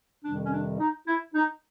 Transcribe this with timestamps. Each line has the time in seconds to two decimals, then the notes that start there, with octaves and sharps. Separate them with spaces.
0.23 F2 C3 D#3 G3 D4
0.44 C#4
0.51 D4
0.79 D#4
1.07 E4
1.34 D#4